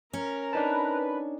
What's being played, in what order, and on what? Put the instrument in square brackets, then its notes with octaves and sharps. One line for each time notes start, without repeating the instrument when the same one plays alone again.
[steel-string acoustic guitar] C#4 [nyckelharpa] A#4 A#5
[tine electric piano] D4 D#4 A5 [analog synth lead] B4